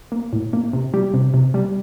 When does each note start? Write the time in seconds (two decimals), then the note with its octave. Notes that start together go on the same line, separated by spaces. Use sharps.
0.12 A#3
0.33 A2
0.53 A#3
0.73 C3
0.94 G3 G4
1.14 C3
1.34 C3
1.54 G3